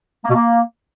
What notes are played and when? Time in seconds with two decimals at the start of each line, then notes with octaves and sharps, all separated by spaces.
0.25 A#3
0.30 B2
0.35 A#3